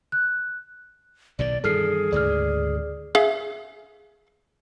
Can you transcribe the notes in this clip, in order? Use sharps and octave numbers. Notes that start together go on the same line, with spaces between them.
F#6
B1 B2 D#3 D5
G2 D#3 E3 G#4 A4 F6 C7
D2 G#2 C#3 D5 F6
G#4 E5 F5